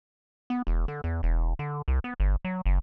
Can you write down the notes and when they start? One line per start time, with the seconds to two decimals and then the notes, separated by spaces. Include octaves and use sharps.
0.50 B3
0.67 E1
0.88 D3
1.04 E2
1.23 E1
1.59 D3
1.88 C2
2.04 B3
2.20 G1
2.45 F#3
2.66 F#1